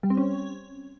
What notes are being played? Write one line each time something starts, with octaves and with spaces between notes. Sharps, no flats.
G3
C4
C#4